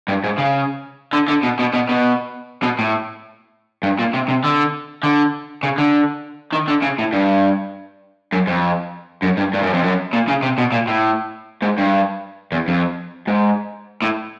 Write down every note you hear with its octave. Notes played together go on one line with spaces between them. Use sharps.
G2
G#2
C#3
D3
D3
B2
B2
B2
B2
B2
A2
G2
A#2
C3
C3
D3
D3
C#3
D3
D#3
D3
C#3
A2
G2
F#2
F2
F#2
G2
G2
F#2
F2
F#2
A#2
C#3
C3
B2
A#2
A2
G#2
G2
E2
F2
G#2
A2